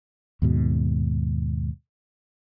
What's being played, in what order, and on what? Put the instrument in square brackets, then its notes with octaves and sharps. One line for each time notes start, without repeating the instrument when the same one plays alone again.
[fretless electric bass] D#2 G#2 B2